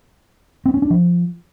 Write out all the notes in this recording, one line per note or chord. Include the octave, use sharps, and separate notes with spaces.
C4
C#4
D4
F3